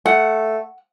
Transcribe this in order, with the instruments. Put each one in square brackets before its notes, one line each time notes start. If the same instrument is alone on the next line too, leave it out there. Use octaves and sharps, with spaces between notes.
[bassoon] A3 [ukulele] F#5